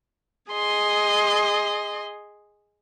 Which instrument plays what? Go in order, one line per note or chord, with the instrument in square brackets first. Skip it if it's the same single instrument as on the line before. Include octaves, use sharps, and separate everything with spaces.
[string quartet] G#4 D#5 C6